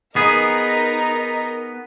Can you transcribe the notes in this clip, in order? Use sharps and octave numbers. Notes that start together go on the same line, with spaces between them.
B3 D#4 G#4 A#4